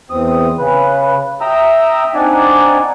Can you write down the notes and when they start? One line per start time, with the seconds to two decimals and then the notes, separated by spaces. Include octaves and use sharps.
0.10 E2 C4 D#6
0.58 C#3 B4
1.41 E5 G5 A#5 D#6 E6
2.15 C4 D4 D#4 D5 F#5 G#5